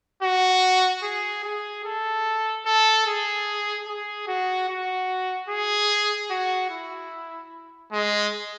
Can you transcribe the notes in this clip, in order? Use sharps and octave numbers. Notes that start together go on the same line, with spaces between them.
F#4
G#4
G#4
A4
A4
G#4
G#4
F#4
F#4
G#4
F#4
E4
G#3